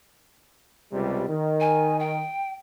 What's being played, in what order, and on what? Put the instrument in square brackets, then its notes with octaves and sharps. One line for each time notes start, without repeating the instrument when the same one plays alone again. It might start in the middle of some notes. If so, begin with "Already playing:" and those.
[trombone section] C#2 C3 G3
D#3
[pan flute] G#5
G5